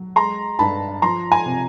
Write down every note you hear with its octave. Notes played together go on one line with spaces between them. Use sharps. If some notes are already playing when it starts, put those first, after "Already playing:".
Already playing: F#3
G#3 A#5 C6
G2 A5 B5
F3 A#5 C6
G#5 A#5
C3